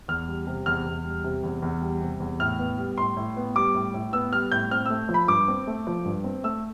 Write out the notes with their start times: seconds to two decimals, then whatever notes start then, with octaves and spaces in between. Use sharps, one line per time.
0.08 E2 F6
0.28 G3
0.47 C3
0.66 E2 F6
0.86 E2
1.05 G3
1.24 C3
1.43 E2
1.62 E2
1.82 G3
2.01 C3
2.20 E2
2.40 A2 F6
2.59 B3
2.78 G3
2.98 A2 C6
3.17 A2
3.37 B3
3.55 G3 D6
3.74 A2
3.94 A2
4.13 B3 E6
4.32 G3 F6
4.52 A2 G6
4.71 C4 F6
4.86 A3 E6
5.09 F3
5.14 B5
5.28 G2 D6
5.48 C4
5.67 A3
5.87 F3
6.05 G2
6.24 C4
6.44 A3 E6